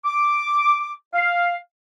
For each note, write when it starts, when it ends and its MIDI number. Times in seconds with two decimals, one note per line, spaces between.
0.04 0.93 86
1.14 1.55 77